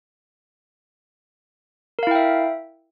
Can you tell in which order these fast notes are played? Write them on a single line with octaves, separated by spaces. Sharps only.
A#4 F5 E4 G5 E5